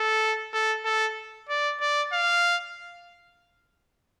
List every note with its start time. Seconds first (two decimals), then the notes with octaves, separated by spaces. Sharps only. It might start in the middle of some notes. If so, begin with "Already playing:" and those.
Already playing: A4
0.53 A4
0.85 A4
1.49 D5
1.80 D5
2.13 F5